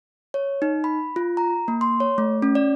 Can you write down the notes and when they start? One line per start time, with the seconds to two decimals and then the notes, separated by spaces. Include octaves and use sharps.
0.34 C#5
0.62 D#4
0.84 B5
1.16 F4
1.37 A#5
1.68 A#3
1.81 C6
2.00 C#5
2.18 A3
2.42 C#4
2.55 D5